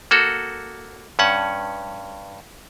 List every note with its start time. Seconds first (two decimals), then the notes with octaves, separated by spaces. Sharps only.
0.11 A#3 F#4 A4
1.19 G2 C#4 F#5